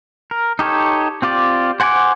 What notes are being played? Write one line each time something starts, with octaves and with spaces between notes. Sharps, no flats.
A#4
D#4 G4 A4 C#5
C4 F4 G4 D5
C5 F#5 G#5 A#5 D6